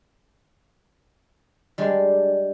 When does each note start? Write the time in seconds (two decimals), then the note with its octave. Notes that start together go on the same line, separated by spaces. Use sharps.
1.78 G3 G#3 D4